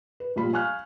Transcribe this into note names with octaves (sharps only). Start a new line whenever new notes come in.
B4
A#1 A#2 G3 F4 B5
F5 G#5 C#6 F6 F#6